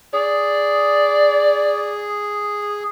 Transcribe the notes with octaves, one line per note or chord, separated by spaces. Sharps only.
G#4 D5